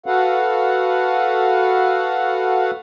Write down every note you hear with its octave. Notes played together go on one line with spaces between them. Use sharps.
F#4 A4 B4 F5 F#5